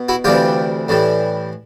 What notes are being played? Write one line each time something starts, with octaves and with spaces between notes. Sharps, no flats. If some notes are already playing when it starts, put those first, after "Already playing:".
Already playing: B2
E4 F#4
D2 C3 E3 G3 F4 G4
A2 E3 G3